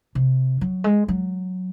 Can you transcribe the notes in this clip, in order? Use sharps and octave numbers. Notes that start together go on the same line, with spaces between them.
C3
F#3
G#3
F#3